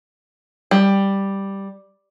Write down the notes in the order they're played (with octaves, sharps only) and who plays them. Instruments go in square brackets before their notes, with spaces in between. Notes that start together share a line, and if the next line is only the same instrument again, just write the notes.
[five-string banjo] G3